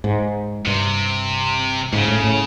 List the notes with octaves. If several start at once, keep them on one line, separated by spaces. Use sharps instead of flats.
G#2
G2 C3
G#2 C#3
A2
A2